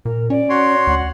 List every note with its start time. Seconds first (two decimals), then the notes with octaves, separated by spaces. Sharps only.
0.05 A#2 A#4
0.30 C#4 D5
0.50 F#4 C#5 C6
0.87 D2 F#5